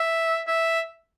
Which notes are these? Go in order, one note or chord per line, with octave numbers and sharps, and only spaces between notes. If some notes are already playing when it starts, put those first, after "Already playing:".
Already playing: E5
E5